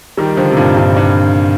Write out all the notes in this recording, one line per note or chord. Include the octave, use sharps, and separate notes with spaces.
D#3 G3
D3 F3
C3
G2 A#2
G2
G2